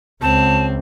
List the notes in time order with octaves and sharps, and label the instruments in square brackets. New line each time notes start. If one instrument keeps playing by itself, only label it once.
[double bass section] C#2 [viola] C4 [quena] A5